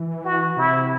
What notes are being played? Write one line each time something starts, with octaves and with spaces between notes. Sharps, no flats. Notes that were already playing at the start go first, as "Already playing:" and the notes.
Already playing: E3
F#4
C3 E4